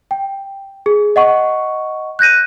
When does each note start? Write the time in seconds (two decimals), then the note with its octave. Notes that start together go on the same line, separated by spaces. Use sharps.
0.11 G5
0.86 G#4
1.16 D#5 F#5 C#6
2.19 F#6 G6 A#6 D#7